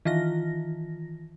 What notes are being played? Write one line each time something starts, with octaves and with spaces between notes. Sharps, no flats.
D#3 E3 F4 A#6